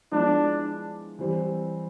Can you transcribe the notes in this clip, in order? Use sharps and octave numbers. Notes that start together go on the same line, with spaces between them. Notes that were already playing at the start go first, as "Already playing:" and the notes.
F3 G#3 B3 D4 E4
E3 G3 C4